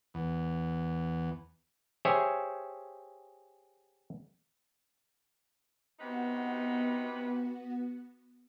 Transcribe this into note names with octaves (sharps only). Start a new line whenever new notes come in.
E2
G4 G#4 C5 C#5 E5 G#5
C3 B3 D#4 F#4 B4